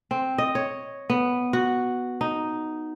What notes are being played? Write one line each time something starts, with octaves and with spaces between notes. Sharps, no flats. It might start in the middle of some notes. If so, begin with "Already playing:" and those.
C4
D#5
C#5
B3
F#4
D#4